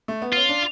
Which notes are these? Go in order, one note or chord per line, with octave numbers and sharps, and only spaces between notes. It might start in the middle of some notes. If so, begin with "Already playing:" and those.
A3
B3
C#4 F4
D4